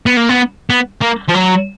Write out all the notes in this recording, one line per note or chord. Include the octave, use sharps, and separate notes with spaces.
B3
A#3
B3
B3
A#3
F3
F#3